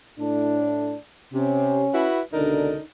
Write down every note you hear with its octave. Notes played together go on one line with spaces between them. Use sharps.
A2 D4
C3 C#4
E4 F#4 B4
C#2 B2 D3 D4 D#4 A#4